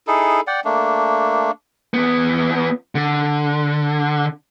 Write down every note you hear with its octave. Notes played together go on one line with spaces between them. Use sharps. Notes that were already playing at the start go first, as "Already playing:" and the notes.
D#4 E4 G#4 A4
D5 F#5 G5
A3 A#3 D4
E2 B3
D3